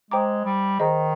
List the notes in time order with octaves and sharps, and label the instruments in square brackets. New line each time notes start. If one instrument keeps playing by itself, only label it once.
[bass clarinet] G#3 [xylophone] C5 G5 A#5 D6
[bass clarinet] G3
[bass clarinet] D#3 [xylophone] G#4 C5 D#5 A#5